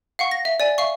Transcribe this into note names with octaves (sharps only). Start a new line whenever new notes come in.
F5 F#5 C#6
A#6
E5
D5 G#5
E5 F5 C#6